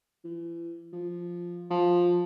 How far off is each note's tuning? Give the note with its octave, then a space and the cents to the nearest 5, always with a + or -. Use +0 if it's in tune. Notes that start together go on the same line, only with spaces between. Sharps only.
E3 +40
F3 +0
F3 +10